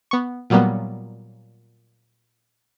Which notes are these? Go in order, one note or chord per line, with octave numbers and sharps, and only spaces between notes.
B3 C#6
A#2 F#3 G3 A#3 B3